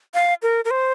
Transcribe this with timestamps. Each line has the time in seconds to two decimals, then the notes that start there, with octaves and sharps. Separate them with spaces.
0.14 F5
0.42 A#4
0.65 A#4
0.71 C5